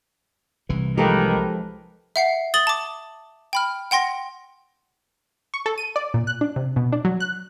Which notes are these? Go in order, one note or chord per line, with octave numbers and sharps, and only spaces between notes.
C2 E3
D#3 F3 G#3 A#3 G4 A4 B4
E5 F#5 C7
D#6 A6 F#7 G7
A5 D6
G5 B5 F6
F#5 G5 C6 A#6
C#6
A4
D#7
D5
A#2
F#6
D4
C3
B2
D4
F#3
F#6